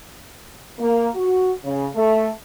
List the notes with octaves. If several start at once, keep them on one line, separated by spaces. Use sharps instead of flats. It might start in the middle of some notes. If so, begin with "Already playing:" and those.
A#3
F#4
C#3
A3